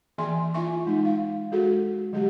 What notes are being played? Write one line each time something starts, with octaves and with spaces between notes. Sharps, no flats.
E3 A#3 G#4 E5 G#5 C6
E4 F4 E5 G#5 C#6
G#3 D#4
F5
G#3 F#4 G#4 A4
D3 F#3 G#3 G4